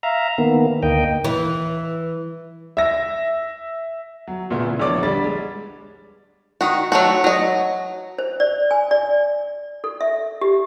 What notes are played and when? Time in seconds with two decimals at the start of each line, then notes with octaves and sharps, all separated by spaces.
0.03 E5 F5 A#5
0.38 D#3 A#3 B3
0.83 D2 A#3 D#5 G5
1.24 E3
2.77 E5 A#6
4.28 F#3
4.51 A#2 C#3 A3 B3
4.66 E3
4.79 A#1 B3 C#5 D5 D6
5.03 D3 G3 A6
5.24 G#3
6.61 D#3 F#4
6.92 F#3 A3 F#4
7.24 F#3 D#5
8.19 C5
8.40 D5
8.71 G#5
8.91 D5
9.84 A4
10.01 E5
10.41 G4